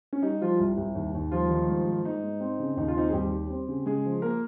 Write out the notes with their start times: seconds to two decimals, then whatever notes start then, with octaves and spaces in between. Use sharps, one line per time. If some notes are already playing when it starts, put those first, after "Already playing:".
0.13 C#4
0.22 G3 D#4
0.41 F3 G3 F4
0.60 C2
0.78 C2
0.95 D#2
1.14 D#2
1.31 F3 G3 F4
1.51 D#3
1.68 G#2
1.86 G#2
2.05 G#2 D#4
2.23 G#2
2.40 C4
2.60 C#3
2.77 D#2 D#4
2.88 F4
2.96 C4 D#4
3.09 G#4
3.13 D#2 G3 G4
3.32 G3
3.50 C4
3.68 C#3
3.86 C#3 G#3 G#4
4.05 F3
4.22 A#3 A#4